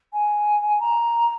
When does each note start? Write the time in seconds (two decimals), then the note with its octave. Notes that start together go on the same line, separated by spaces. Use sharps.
0.13 G#5
0.80 A#5